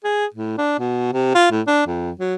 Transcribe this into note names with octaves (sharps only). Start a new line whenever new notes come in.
G#4
A2
D4
B2
C3
F4
A2
D4
F2
F#3